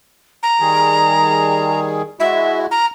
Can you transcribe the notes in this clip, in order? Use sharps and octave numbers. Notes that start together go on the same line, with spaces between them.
A#5
D#3 G3 G#4
G#3 E4 F#4 E5
A#5 F6